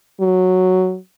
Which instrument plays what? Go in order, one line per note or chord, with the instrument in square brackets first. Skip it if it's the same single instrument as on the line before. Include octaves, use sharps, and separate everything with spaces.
[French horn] F#3